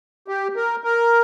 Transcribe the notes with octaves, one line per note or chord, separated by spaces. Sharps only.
G4
A#4
A#4